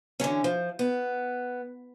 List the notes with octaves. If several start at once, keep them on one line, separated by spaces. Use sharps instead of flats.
D3 E3 F#3 C#4
F3
B3